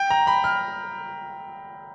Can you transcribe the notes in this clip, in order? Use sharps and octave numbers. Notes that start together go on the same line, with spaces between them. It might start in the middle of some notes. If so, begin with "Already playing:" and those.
Already playing: G5
A#5
B5
F6